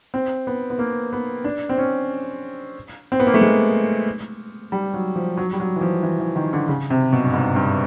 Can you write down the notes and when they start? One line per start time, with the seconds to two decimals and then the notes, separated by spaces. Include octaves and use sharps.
0.14 C4
0.47 B3
0.70 B3
0.79 A#3
1.13 B3
1.44 D4
1.69 C4
1.78 C#4
3.12 C4
3.20 B3
3.27 A#3
3.34 A3
3.41 G#3
4.72 G3
4.94 F#3
5.16 F3
5.37 F#3
5.53 G3
5.60 F#3
5.76 E3
5.81 F3
6.03 E3
6.20 E3
6.36 D#3
6.53 D3
6.68 C#3
6.90 C3
7.13 B2
7.24 G2
7.34 G#2
7.56 G2